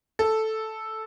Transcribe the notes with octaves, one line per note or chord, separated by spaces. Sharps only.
A4